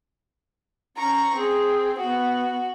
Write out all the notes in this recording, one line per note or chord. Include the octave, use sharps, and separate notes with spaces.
C#4 A#5 C#6
C4 G#4
B3 F#4